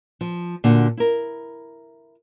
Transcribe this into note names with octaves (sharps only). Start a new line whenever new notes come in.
F3
A#2 D3 F#4
E4 A#4